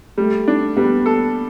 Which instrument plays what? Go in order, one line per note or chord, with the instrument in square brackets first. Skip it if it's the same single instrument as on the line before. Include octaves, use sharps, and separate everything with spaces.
[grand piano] G3 [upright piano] A3
[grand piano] D4
[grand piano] G3 [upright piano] B3
[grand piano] A4